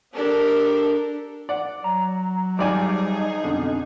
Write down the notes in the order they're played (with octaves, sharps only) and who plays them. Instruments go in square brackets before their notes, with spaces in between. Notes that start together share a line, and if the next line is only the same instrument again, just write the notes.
[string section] D4 G4 A4 A#4
[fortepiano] D5 F#5
[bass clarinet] F#3 [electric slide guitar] A#5
[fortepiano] G#1 D5 G#5 [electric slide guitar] G3 G4 [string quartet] D#4 G#4
[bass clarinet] F2 [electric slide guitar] B2 [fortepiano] D3